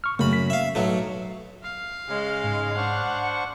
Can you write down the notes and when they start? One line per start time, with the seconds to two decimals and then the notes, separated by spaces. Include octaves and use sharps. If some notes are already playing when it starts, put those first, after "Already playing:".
0.04 C#6 F6
0.19 F#2 C#3 A3 A#3 B5
0.33 B6
0.50 E5 F5
0.75 B1 F#3 A3
1.63 F5
2.09 C#3 G#3 F6
2.43 G#2
2.77 D4 C5 F#5 C#6
3.18 C#7